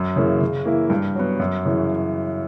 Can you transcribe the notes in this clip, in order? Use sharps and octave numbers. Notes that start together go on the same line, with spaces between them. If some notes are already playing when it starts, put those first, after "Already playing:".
Already playing: F#2
C#3 E3 A#3
C#3
E3 A#3 E4
G2
F#3 B3
F#2
C#3 E3